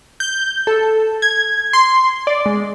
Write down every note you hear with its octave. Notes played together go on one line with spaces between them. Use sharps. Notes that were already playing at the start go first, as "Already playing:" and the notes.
G6
A4
G#6
C6
D5
G#3